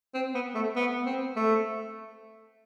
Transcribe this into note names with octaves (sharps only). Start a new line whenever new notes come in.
C4
B3
A3
B3
C4
A3